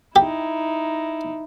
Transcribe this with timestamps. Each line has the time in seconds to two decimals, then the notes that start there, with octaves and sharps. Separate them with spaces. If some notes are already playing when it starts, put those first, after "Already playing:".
0.16 D#4 E4 G4